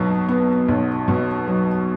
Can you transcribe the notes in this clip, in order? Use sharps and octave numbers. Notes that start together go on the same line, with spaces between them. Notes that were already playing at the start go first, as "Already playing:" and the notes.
Already playing: B1 B2 F#3
B3
B1
B2
F#3